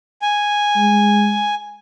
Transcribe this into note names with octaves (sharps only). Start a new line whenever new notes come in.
G#5
G#3